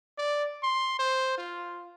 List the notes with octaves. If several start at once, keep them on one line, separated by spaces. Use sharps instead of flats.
D5
C6
C5
F4